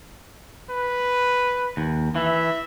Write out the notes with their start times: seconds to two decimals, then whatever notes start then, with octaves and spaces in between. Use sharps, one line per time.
0.69 B4
1.77 D#2
2.16 E3 E5